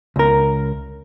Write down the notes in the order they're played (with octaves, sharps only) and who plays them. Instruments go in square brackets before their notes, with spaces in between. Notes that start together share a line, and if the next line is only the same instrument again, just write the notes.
[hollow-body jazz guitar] C#2 A#4